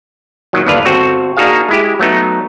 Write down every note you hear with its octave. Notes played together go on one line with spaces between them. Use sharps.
A#2 D#3 F#3
G1 D#2 D3 D4 B4 F5
G1 C4 F#4 A4
A#3 D4 D#4 F#4 G#4 F5
G#3 E4 G4
F#3 A3 B3 D#4